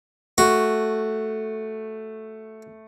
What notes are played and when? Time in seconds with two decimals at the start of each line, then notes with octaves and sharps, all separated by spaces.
0.38 A3 F#4